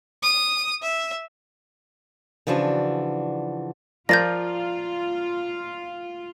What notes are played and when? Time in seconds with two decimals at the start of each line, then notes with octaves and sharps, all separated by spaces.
0.23 D#6
0.82 E5
2.47 C#3 E3 F3 D4 F#4
4.09 F3 F4 A#4 D5 G6 A6 A#6